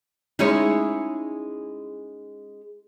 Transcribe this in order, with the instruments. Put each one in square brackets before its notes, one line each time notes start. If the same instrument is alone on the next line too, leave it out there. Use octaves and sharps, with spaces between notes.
[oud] G#3 C#4 D#4 [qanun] E4 G#4 C#5